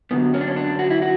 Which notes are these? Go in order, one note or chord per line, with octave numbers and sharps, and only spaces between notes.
F#2 D3 F#3 B3
C#4
D4
C#4
D4
F#4
E4
F#4